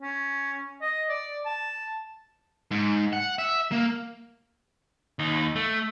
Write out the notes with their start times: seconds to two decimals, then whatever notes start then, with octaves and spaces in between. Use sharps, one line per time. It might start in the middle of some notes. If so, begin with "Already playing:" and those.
0.02 C#4
0.82 D#5
1.09 D5
1.45 A5
2.71 G#2
3.13 F#5
3.38 E5
3.72 A#3
5.19 D#2 D#4
5.56 A3